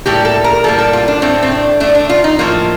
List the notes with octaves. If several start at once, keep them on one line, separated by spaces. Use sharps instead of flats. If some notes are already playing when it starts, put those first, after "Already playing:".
A2 G3 A#3 G4
A4
A#4
A2 G3 A#3 A4
A4
F4
D4
A2 A3 C4
C4
D4
A2 A3 D4
D4
F4
D#4
A2 F3 A#3 F4